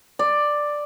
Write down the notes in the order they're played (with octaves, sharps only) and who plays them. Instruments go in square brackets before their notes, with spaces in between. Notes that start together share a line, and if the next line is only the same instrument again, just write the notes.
[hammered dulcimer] D5